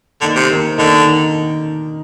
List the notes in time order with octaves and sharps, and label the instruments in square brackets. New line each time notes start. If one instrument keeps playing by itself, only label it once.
[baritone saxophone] D3 [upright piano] D#3 A#3 D#4 A#4
[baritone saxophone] C3
[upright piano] D#3 A#3 D#4 A#4
[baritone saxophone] D3 [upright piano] D#3 A#3 D#4 A#4
[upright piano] D#3